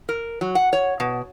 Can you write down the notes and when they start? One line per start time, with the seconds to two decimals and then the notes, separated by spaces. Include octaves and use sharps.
0.09 A#4
0.41 F#3
0.55 F#5
0.73 C#5
1.00 B2